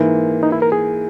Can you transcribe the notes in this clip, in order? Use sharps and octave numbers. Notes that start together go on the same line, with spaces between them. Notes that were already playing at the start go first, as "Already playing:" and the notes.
Already playing: G#2 E3 A#3
D#4
E4
A#4
G#4